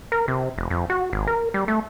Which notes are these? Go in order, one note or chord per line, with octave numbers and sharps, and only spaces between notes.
A#4
C3
F1
F2
F#4
G#1
A#4
G3
A3